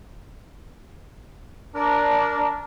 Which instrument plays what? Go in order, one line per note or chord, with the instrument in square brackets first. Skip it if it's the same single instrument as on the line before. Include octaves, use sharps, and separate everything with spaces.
[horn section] D4 A#4